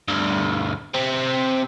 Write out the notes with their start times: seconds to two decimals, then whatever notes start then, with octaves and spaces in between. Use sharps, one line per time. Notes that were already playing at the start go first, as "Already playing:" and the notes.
0.08 D2 G2
0.94 C3 C4